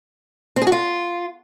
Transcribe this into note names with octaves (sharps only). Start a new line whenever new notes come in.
C4
G#4
F#4
F4